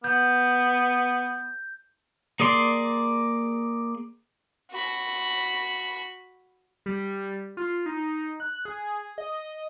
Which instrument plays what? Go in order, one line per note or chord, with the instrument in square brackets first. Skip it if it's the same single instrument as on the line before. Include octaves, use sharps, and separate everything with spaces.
[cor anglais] B3 [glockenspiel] G6
[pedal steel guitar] A#3 G#4 D5 C6
[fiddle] F#4 B5
[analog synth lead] G3
F4
D#4
F#6
G#4
D#5